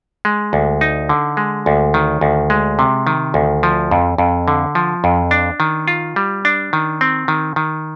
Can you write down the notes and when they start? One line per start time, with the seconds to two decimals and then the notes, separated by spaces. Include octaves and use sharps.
0.25 G#3
0.53 D2
0.81 D#4
1.09 D3
1.37 G#3
1.66 D2
1.94 D#3
2.21 D2
2.50 G#3
2.79 C3
3.07 D#3
3.34 D2
3.63 F3
3.91 F2
4.18 F2
4.48 D3
4.75 F3
5.04 F2
5.31 D4
5.60 D#3
5.88 F4
6.16 G3
6.45 D4
6.73 D#3
7.01 C4
7.28 D#3
7.56 D#3